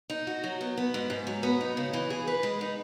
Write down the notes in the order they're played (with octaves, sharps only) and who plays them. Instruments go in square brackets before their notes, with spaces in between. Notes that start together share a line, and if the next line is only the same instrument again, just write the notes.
[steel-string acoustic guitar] D#4
F#4
F#3
B3
B3
G#2
G#2
F#3
B3
D#4
C#3
E3
G#4
B4
G#3
D#4